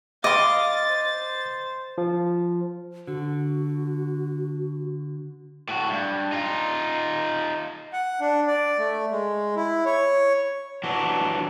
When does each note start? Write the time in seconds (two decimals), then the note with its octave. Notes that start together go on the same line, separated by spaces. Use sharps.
0.24 D#5 F5 C6 D6 A6
0.89 C5
1.98 F3
3.07 D3 F#4
5.69 A2 F#4
5.89 G2
6.32 D#4 F4
7.93 F#5
8.21 D4
8.48 D5
8.78 A3
9.11 G#3
9.56 E4
9.86 C#5
10.84 E3 F#3 D4 F#4